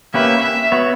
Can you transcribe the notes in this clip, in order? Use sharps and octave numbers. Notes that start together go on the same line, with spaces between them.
A#3 C#4 G4 B4 E5
E5
B3 F#4 C#5